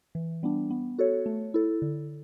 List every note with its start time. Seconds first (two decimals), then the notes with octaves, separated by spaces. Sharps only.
0.15 E3
0.43 G3 B3 D4
0.70 B3
0.99 F#4 A4 C#5
1.26 A3
1.54 E4 A4
1.82 D3